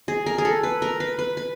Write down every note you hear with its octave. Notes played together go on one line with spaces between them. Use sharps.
G#4
A#4
G#4
A4
B4
A#4
B4
B4
B4